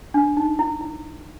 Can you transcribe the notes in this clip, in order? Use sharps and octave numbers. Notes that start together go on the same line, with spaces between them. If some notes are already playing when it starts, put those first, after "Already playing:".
D4
D#4
E4
E4